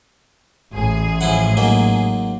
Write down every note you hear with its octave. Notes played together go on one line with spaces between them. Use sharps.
A1 G#4
F3 E4 F#5
G#2 F#3 A#3